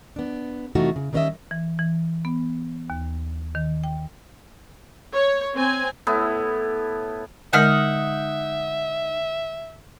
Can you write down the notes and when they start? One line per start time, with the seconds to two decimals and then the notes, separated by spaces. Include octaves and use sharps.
0.16 B3 D4
0.75 C3 E3 A3 D#4 F4 F#4
0.96 C#3
1.13 D#3 G3 C#4 B4 D#5 E5
1.51 E3
1.79 E3
2.25 B3
2.90 D#2
3.55 D#3
3.84 G5
5.12 C#5
5.55 C4 G#5
6.07 A2 B3 E4
7.53 D3 G#3 D#4 A#4 E5 F#5 F6